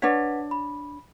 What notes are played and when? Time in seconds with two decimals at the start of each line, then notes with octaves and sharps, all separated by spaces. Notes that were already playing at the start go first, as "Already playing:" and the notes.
0.02 D4 B4 C#5 F#5 B6
0.51 B5